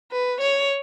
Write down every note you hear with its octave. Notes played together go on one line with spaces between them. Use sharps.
B4
C#5